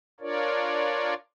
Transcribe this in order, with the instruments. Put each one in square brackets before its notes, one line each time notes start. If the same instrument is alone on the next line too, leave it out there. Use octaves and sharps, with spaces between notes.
[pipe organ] D4 F4 A#4 C#5 D5